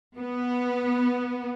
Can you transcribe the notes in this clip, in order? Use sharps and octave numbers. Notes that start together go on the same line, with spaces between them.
B3